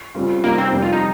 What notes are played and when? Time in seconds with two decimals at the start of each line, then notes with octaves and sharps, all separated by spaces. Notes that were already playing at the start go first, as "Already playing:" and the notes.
0.15 C#3 G3 C4 F4
0.43 C3 G3 A#3 C4 D#4
0.58 C4
0.72 F2 C3 G3
0.82 F4
0.92 D#4